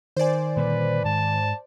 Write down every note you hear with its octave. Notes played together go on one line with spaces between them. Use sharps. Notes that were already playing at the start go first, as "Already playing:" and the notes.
D#3 C5 D5 G#5
A#2 D3 G3 B4
G#2 A5